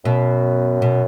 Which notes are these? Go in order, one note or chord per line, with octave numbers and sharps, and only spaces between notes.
F#2 B2
B2